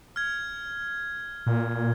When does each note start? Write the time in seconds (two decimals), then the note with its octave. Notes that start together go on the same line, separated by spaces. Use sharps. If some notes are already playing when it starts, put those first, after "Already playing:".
0.16 F6 G#6
1.46 A#2